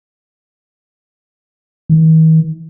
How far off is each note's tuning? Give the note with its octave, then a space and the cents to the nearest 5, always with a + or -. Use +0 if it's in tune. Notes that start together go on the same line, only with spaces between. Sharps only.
D#3 +45